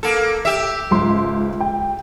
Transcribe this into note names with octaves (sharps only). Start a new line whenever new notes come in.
A#3 A4
G4 E5
C#2 G#2 C6
G5